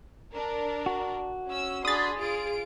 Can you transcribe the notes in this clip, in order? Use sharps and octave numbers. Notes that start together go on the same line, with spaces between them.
D4 A#4
F#4
C#4 E6
D4 G#4 B5 C6 D#6 A6
F4 G#4 D7